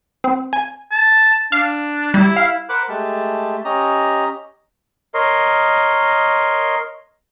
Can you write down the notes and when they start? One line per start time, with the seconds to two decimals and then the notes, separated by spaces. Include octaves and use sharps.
0.24 C4
0.53 G#5
0.91 A5
1.52 D4 F5
2.14 G3 E4
2.37 F5
2.69 A#4 C5 F#5 B5 D6 F#6
2.89 G#3 A3 G4 A5
3.65 C#4 G4 D#5 A#5
5.14 A#4 C#5 D#5 C6